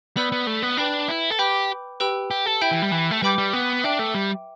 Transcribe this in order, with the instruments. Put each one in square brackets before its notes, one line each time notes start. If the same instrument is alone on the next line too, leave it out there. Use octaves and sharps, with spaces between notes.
[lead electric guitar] B3 [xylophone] D5 B5 E6 G6
[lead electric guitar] B3
A3
B3
[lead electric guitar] D4 [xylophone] B4 G5 B5
[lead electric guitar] E4
A4
[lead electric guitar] G4 [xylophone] B4 G5 B5 D6 G6
[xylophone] G4 B4 G5 B5 E6
[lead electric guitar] G4
A4
[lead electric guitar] E4 [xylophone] E5 G5 B5 G6
[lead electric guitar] E3
G3
E3
A3
[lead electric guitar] G3 [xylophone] B4 G5 B5 D6 G6
[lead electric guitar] G3
B3
[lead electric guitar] D4 [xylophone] E5 G5 D6
[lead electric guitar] A3
G3